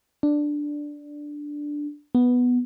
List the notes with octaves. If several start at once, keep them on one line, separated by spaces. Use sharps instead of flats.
D4
B3